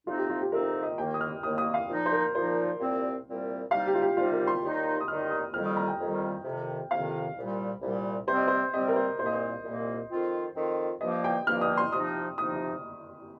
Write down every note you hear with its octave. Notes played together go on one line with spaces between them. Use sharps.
F2 C3 F3 C4 D#4 F4
G4
F4
G4
F2 C3 F3 C4 D#4 A#4
D#5
D#2 D#3 A#3 G5
D#6
F6
D#2 D#3 A#3 D#6
D#6
F5
A#2 F3 D#4
C5
A#4
A#2 F3 D#4 C5
C2 A#2 G3 C4
C2 A#2 G3 C4
C3 G3 D#4 F5
G4
F4
G4
C3 G3 D#4 F4
A#4
C6
D#2 D#3 G3 D#4
D#6
D#2 D#3 G3 D#4 F6
D#6
F2 D#3 G3 F6
D#6
A#5
G5
F2 D#3 G3
F2 C3 D#3
F2 C3 D#3 F5
C2 A#2 G3
C2 A#2 G3
C3 G3 C4 C5
D#5
C5
C3 G3 C4 D#5
A#4
C5
C2 A#2 A#3 C5
D#5
C5
C2 A#2 A#3
F2 D#3 C4 F4
F2 D#3 C4 F4
G2 F3 A#3 D#5
G5
G2 F3 A#3 F6
D#6
C6
C3 F3 D#4 D#6
C3 F3 D#4 D#6